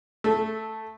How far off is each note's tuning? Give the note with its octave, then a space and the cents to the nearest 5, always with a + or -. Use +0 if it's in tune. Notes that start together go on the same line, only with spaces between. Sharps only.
A3 +0 A4 -15